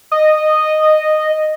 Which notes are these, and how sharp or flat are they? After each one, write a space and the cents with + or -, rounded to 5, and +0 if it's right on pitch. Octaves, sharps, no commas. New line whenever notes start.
D#5 -10